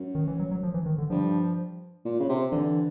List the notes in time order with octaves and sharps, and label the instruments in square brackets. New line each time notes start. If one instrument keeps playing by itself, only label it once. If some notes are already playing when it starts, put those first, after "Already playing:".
Already playing: [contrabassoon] F#2
[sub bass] D#3
E3
F#3
F#3
F3
E3
D#3
D3
[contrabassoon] G2 [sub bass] F3
[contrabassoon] A#2
C#3
C3
[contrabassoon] D3 [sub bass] E3